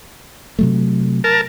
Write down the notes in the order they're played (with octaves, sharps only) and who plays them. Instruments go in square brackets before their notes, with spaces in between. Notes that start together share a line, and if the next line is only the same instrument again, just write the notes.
[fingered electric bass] C3 F#3 A3
[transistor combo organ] A#4 A5